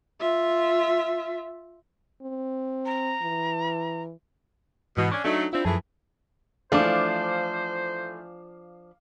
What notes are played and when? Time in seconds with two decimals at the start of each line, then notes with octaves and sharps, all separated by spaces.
0.20 F4 E5
2.22 C4
2.86 A#5
3.22 E3
4.97 G#2 B2 E3
5.12 C#4 D4 C#6 G#6
5.25 F#3 A3 D4 D#4 D#5
5.53 C4 D4 E4 F4
5.65 F#2 E3 F3 A3 G#4 A5
6.72 E3 F3 A3 D4 C5 F5 D6